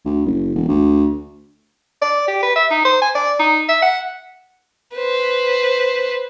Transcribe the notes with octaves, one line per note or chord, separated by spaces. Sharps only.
D2
F#1
E1
D2
D5
G4
B4
E5
D#4
C5
G#5
D5
D#4
E5
F#5
B4 C5